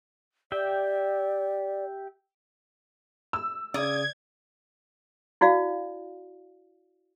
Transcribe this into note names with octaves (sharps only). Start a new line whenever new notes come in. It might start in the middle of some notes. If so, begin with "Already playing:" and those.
G4 D5 E5 G5
E6
C#3 D5 D#6 G#6
E4 F#4 D5 F5